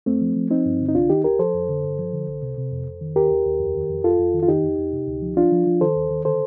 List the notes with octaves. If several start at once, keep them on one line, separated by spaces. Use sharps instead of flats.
F2 A3 C4
F3
F3
F3 C4 D#4
G2
D3
D#4
C2 D4 F4
D#3 D#4 G4
C2 G4 A#4
F3 A4 C5
F2
D3
G2
F3
D3
C2
C3
C3
F2
F2
D#3
D#2 G4 A#4
D#2
D#2
F2
D#3
F2
F2 F4 A4
F2
D#3
F4
D#3 D#4 G4
F2
F2
C3
D2
F3
F3 D4 F4
F3
F3
D#3 A4 C5
D#2
D#3
D3 A4 C5